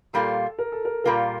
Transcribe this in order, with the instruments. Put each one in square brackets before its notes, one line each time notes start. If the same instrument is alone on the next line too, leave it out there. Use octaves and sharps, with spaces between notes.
[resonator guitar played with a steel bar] A#2 G3 A#3 F4 [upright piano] A4
[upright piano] A#4
A4
A#4
[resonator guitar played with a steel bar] A#2 G3 A#3 F4 [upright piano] A#4